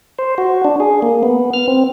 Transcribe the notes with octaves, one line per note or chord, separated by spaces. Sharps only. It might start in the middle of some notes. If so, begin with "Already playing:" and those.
C5
F#4
D4
G#4
A#3
B3
F6
C4